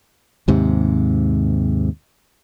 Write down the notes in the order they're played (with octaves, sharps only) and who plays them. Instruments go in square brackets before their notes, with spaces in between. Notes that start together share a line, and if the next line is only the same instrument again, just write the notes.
[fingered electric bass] D#2 G#2 C3